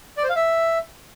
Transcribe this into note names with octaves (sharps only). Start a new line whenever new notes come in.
D5
C5
F5
E5